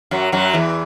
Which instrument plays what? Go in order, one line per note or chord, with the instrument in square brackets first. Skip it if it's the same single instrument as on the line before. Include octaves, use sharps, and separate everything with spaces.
[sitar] F#2 F#3
F#2 F#3
E2 E3